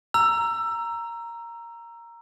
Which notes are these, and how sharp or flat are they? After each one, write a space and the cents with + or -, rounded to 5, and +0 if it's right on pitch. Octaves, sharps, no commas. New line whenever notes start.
A#5 +0 E6 +20